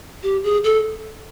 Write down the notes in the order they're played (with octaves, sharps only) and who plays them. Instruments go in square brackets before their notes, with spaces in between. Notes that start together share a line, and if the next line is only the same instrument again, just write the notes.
[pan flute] G4
G#4
A4